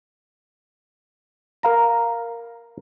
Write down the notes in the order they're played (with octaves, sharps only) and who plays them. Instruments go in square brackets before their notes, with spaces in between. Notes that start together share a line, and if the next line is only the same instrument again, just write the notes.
[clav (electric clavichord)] A#4 F5 A#5